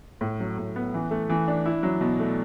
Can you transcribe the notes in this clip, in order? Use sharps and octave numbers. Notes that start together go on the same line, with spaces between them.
A2
F#3
A2
B3
E3
A3
E3
D4
E4
F#3
B2
A3